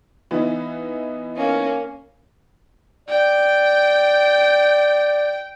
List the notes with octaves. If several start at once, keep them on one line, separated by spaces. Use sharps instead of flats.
E3 B3 D#4
A#3 C#4
D5 G5